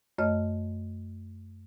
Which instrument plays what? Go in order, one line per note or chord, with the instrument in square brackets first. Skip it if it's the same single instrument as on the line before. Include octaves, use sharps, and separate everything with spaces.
[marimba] F#2 A3 C#5 D#5 F6